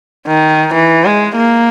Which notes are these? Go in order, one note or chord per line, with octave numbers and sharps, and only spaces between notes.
D#3
E3
G#3
A#3